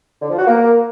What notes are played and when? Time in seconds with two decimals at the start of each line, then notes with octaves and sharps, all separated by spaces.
0.22 D3
0.30 F3
0.39 F#4
0.47 A#3